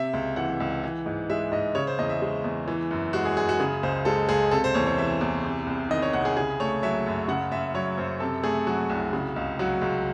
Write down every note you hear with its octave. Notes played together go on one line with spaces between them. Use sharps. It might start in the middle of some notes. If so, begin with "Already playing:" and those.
Already playing: C3 E5
C#2
E3 F#5
C#2
E3
G#2
G#3 E5
G#2 D#5
C#3 C#5
C5
E2 D#5
E5
G#3
E2
E3
F#2
G#3 F#4
G#4
F#2 G#4
F#4
C#3 G#4
C#2 C5
G#3 A4
C#2 G#4
C3 A4
C5
E2 C#5
C#5
E3 E5
E2
C3
C2
D#3 D#5
C#5
C2 F#5
G#4
C#3 G#4
A3 C#5
F#3 E5
F#2
C#3 F#5
F#2 E5
F#3 C#5
F#2 C5
C3 A4
A3 G#4
F#3 F#4
C2
C#3
C#2
F#3 F#4
C#2